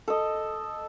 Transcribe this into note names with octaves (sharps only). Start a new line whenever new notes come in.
A4 D#5